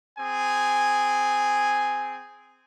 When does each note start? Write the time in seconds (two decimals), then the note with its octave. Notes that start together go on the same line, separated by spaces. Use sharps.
0.19 C4 G#4 G#5